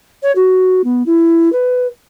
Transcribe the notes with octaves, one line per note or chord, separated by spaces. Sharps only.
C#5
F#4
B3
E4
B4